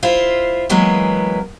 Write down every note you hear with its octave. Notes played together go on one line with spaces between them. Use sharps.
E4 F4 C5
E3 F#3 G#3 A#3 B3